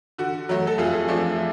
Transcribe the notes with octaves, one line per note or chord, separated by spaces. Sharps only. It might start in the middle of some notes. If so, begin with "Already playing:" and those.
D3 F#4
F#3 A3
A4
F2 F4 G#4
F3 A3 D4